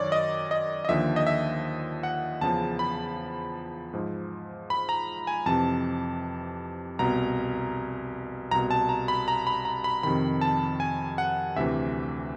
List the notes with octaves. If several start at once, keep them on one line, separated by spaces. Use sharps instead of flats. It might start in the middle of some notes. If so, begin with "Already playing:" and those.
Already playing: F#2 D#3 C#5 D5
D#5
D#5
D#5
D#2 D3 F3 E5
D#5
E5
F#5
E2 C#3 F3 A5
B5
G#2 F3
B5
A#5
G#5
F2 C3 E3 A5
C2 B2 A#5
C2 B2 A#5
A5
A#5
B5
A#5
B5
A#5
B5
F2 C3 D#3 B5
A5
G#5
F#5
D2 C3 E3 E5